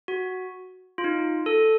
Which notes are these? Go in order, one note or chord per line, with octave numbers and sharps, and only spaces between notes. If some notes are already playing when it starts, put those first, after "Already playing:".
F#4
F4
D#4
A4